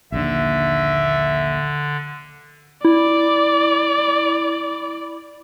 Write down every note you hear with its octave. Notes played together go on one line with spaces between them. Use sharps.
A#1 D#2 D3 D4 E5
E4 D5